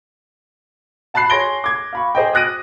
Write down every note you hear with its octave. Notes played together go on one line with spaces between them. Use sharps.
F#5 A5 B5 F#6 C7
G#4 C#5 C6 A#6 D7 G7
D6 G#6
F5 B5 C#6
G#4 C5 D#5 G5
D#6 F6 F#6 A#6 D7 D#7